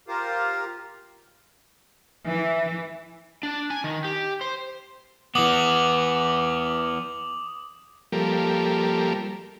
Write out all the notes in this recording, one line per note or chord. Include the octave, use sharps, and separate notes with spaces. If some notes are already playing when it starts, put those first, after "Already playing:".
F4 G4 A#4 C5 F5
E3
D4
G#5
D#3
G4
C5
E3 B3 D6 D#6 F#7
F3 G3 A#3 G4 A4 A#4